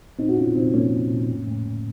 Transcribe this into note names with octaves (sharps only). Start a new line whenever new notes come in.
A#2 C4 D#4
F#4
A#2 C#4 F4
A#2 C4 D#4
A#2 A#3 C#4
A#2
A#2
A2
A2
A2